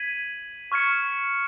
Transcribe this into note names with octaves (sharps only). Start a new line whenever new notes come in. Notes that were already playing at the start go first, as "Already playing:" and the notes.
Already playing: G#6 B6 D#7 F#7
C#6 F6 G#6 C#7